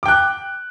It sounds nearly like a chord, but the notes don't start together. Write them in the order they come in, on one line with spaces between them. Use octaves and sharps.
D6 G5 F#6